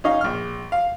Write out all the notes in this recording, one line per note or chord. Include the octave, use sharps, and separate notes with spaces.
C#4 D#4 F5
A#1 F6
F5